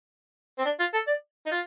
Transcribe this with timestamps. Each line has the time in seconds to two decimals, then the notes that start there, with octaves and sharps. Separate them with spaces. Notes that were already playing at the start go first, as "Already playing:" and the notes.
0.58 C4
0.65 D4
0.79 F4
0.94 A4
1.07 D5
1.46 D#4
1.51 F4